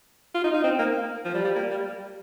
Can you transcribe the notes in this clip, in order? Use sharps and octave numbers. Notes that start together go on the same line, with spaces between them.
F4
D#4
D#4
C4
A#3
F3
G3
G3
A#3
G3